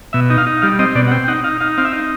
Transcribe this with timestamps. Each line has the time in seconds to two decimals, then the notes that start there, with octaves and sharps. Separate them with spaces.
0.13 B2 E5
0.30 D#4
0.38 F5
0.47 D#4
0.62 G3 F5
0.79 C4 D#5
0.95 B2 D5
1.07 F#5
1.11 C4 G5
1.24 G5
1.28 D#4 F#5
1.44 D#4 F5
1.60 D#4 F5
1.78 C4 F5
1.85 E5
1.93 D#4